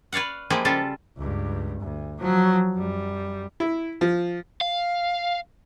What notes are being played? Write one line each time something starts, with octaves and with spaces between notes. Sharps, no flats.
B4 C#5 D5 F5 F#5
F3 G#3 A#3 E4 G4 G#4
C#3 G3 F4 A4
C#2 G2
D2
F3 F#3
F#2 G3
E4
F3
F5